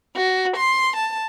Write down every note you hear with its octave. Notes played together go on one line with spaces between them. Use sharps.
F#4
C6
A5